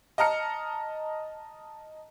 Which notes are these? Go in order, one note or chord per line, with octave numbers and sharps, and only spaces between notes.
D#5 A5 A#5 F6 C#7